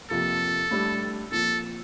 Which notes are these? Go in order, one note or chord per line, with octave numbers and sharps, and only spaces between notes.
F2 C3 F3 A#3 A4
A2 G3 D4
A#2 F3 C4 A4